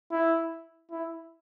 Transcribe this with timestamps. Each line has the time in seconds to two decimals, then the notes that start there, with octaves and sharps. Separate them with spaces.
0.11 E4
0.91 E4